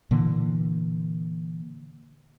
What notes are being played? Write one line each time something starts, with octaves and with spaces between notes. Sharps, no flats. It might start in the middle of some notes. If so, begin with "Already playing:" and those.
A#2 D3 E3 A#3